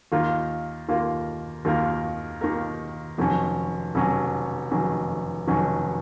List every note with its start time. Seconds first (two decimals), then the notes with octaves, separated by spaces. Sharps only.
0.12 D#2 D#3 A#3 F4 A#4
0.89 D#2 D#3 A#3 F4 A#4
1.65 D#2 D#3 A#3 F4 A#4
2.41 D#2 D#3 A#3 F4 A#4
3.18 F1 F2 D#3 F#3 C#4
3.95 F1 F2 D#3 F#3 C#4
4.71 F1 F2 D#3 F#3 C#4
5.48 F1 F2 D#3 F#3 C#4